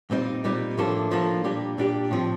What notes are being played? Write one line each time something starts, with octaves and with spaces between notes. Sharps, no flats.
A#2 G3 C4 D#4
A#2 G3 C4 D#4
A2 F3 A#3 D4 A4
A2 F3 A#3 D4 A4
A#2 G3 D4 G4
A#2 G3 D4 G4
A2 F3 C4